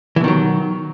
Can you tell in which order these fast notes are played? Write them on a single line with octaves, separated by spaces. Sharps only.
E3 B2 D#3 F#3